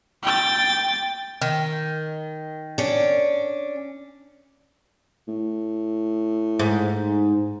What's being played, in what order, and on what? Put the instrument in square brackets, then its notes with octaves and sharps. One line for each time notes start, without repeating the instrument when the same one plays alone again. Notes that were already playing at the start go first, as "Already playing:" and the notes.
[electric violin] G5 A6
[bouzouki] D#3
[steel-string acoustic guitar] C#4 D4
[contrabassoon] A2
[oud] G#2